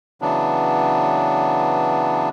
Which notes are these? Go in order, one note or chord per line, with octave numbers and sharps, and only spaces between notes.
C#3 E3 F#3 B3 D4